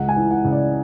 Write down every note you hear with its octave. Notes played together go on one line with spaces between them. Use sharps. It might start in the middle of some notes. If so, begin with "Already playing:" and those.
Already playing: C#2 F#5
G#5
E3
F#5
C#3
D5